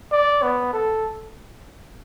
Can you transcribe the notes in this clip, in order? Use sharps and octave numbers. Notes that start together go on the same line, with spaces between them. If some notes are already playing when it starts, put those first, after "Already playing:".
D5
B3
A4